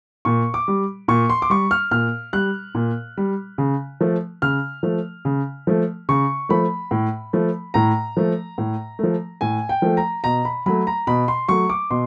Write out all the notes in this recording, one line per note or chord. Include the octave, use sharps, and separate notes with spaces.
A#2 C#6
D6
G3
A#2 C#6
C6
D6
G3 C#6
F6
A#2 F6
G3 F#6
A#2
G3
C#3
F3 A3
C#3 F6
F3 A3
C#3
F3 A3
C#3 C#6
F3 A3 B5
A2
F3 A3
A2 A#5
F3 A3
A2
F3 A3
A2 G#5
G5
F3 A3
A#5
B2 A#5
B5
F#3 A3 B5
A#5
B2 B5
C6
F#3 A3 C#6
D6
B2 C6